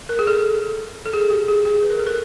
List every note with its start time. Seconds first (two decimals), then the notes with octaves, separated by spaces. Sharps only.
0.09 A#4
0.19 G#4
0.27 A4
1.06 A4
1.13 G#4
1.30 G4
1.48 G#4
1.65 G#4
1.83 B4
1.90 A#4
1.99 A4
2.07 A#4